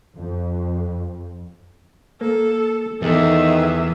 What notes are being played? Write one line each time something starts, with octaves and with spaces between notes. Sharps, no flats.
F2
A#3 A4
E2 D#3 G#4 A4 E5